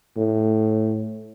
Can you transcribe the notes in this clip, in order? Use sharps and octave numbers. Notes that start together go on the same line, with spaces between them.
A2